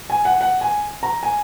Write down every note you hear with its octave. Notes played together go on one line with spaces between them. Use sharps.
G#5
F#5
F#5
G#5
A#5
G#5